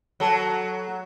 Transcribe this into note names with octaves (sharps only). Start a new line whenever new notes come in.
F#3 A4